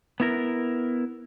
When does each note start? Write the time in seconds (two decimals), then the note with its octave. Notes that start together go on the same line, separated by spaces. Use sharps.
0.20 B3 E4 A#4